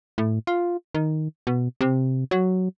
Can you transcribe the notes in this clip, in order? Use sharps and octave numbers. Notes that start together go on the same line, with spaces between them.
A2
F4
D#3
B2
C3
F#3